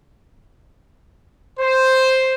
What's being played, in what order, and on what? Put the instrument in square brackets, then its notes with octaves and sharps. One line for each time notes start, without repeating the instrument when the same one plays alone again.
[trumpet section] C5